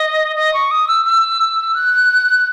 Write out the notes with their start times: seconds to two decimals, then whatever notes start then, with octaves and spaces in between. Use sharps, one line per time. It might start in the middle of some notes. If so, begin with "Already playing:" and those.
Already playing: D#5
0.36 D#5
0.54 C#6
0.71 D#6
0.88 E6
1.06 E6
1.75 F#6